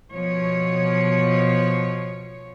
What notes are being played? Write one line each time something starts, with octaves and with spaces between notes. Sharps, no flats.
B2 F3 C#5